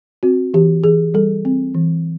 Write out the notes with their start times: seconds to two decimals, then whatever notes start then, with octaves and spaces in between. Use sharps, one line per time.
0.23 C4 F#4
0.54 E3 G4
0.84 E3 G#4
1.14 G3 A4
1.45 C4
1.74 E3